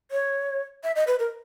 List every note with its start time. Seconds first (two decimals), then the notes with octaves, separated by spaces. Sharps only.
0.11 C#5
0.83 E5
0.96 D#5
1.07 B4
1.19 A#4